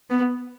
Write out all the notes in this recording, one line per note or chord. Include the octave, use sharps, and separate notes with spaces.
B3